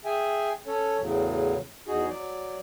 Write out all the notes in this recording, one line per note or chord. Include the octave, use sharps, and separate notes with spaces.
G#4 E5 G5 G#5
C#4 A4 C#5
E2 A2 C#3 F#3
E2 D#4 F#4 G#4
F#3 D5